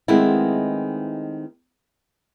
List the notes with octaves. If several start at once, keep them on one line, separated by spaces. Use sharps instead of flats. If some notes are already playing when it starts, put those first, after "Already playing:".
D#3 G#3 A3 B3 C4 E4